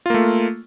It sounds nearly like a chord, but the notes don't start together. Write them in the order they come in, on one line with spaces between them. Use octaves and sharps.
F4 A#3 A3